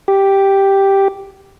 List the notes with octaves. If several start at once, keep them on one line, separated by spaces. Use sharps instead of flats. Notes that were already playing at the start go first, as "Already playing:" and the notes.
G4